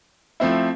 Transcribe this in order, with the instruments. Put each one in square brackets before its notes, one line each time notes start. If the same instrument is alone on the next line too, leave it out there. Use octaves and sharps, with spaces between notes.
[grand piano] F3 A3 C4 E4